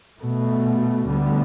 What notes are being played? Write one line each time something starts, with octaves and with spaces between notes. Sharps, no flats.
B2 A3
D2 D3 G3 B3